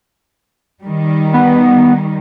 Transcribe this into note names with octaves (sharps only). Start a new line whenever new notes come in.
D#3 G3
B3